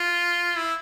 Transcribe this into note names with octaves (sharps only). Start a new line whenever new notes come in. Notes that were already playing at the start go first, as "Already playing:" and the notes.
Already playing: F4
E4